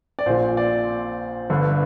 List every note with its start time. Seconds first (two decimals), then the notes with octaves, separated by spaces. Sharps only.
0.19 D5
0.26 A#1 A#2 C5
0.57 D5
1.50 G1 G2 D3